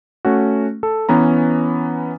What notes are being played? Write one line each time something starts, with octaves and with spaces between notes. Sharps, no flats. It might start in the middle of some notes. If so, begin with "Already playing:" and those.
A3 C#4 F#4
A4
E3 B3 C#4 A#5